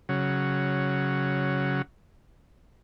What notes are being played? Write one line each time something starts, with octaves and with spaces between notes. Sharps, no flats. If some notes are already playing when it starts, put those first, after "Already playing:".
C#3 F#3